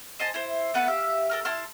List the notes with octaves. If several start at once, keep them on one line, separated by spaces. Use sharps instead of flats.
C5 D#5 G#5 A5
E4 C5
A3 B3 B4 F#5
G4 E5 F5
A4 A#4 F6
E4 A5 C6 F6